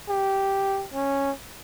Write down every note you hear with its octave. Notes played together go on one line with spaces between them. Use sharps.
G4
C#4